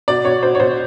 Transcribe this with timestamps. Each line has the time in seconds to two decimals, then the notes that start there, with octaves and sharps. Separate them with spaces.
0.08 B2 D5
0.25 B2 C#5
0.43 B2 C5
0.55 C#5
0.60 B2 C5